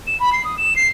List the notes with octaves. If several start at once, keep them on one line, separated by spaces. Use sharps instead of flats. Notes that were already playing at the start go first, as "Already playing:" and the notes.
E7
B5
C7
D#6
E7
C7